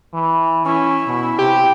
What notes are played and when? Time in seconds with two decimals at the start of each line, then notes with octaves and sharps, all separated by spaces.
0.13 E3
0.65 C#4 E4
1.07 B2
1.39 C3 G4